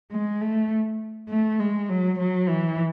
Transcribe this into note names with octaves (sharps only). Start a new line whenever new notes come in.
G#3
A3
A3
G#3
F#3
F#3
E3